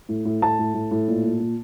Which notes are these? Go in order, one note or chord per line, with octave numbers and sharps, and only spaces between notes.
A2
A2
A2 A5
A2
A2
A2
A#2
A#2
A#2